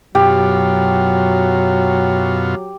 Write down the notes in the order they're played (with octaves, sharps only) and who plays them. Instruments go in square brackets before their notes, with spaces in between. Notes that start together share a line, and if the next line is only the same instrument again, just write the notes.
[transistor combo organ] F#2 B2 F4 [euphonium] F#3 [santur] G4